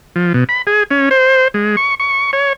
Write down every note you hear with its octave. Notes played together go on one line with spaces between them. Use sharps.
F3
B2
B5
G#4
C#4
C5
G#3
C#6
C#6
C#5